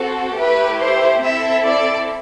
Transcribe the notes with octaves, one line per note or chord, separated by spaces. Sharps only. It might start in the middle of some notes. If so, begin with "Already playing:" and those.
Already playing: C4 F#4 A4
A3 E4 G4 B4
C5
C4 E4 A4 E5
D5